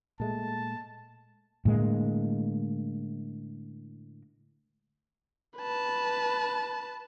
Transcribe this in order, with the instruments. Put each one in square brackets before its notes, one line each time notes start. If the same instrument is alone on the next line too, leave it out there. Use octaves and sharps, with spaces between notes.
[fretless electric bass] A#2 G#3 A3 [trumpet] A5
[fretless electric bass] A2 D3 G#3 A#3
[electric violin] B4 A5